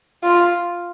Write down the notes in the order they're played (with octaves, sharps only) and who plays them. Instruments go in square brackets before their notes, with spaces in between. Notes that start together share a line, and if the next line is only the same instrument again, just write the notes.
[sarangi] F4